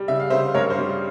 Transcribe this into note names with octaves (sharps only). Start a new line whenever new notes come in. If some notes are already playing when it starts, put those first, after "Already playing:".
Already playing: G3
C#3 E5
F5
C#3 C5 E5
G2 A#4 C#5
C5
G3